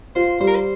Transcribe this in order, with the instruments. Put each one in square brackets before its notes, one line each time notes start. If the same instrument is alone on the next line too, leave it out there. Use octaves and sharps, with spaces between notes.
[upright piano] F4 [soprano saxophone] C5
[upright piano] G3 [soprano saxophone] C5
[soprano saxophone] A#4
C5